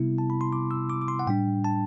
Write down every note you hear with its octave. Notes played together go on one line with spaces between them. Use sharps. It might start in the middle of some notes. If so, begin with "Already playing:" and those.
Already playing: C3 G3 B3 E4
A5
B5
C6
D6
E6
D6
D6
C6
F#5
A2 G3 D4 G5
A5